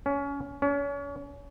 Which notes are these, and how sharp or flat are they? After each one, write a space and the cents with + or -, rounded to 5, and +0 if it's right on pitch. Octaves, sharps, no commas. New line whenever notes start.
C#4 +25
C#4 +35